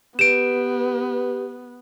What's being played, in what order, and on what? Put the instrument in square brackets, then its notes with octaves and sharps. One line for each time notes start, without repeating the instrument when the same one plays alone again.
[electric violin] B3 [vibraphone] G4 B4 [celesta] D7 E7